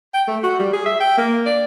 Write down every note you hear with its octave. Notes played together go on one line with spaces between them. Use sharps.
G5
A3
F#4
G3
G#4
E5
G5
A#3
D5